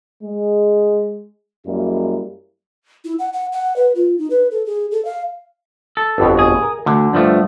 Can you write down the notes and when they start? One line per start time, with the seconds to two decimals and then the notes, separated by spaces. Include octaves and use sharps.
0.22 G#3
1.65 F#2 G3 G#3 A#3 E4
3.05 E4
3.19 F#5
3.33 F#5
3.52 F#5
3.76 B4
3.95 F4
4.18 D#4
4.30 B4
4.51 A4
4.66 G#4
4.91 A4
5.05 F5
5.97 A4
6.18 G1 F2 B2
6.39 G#4
6.63 A#4
6.86 D2 D3
7.13 G2 F3 A3